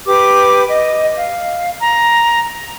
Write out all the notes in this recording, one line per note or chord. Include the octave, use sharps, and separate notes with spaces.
G4 B4 D6
D#5
F5
A#5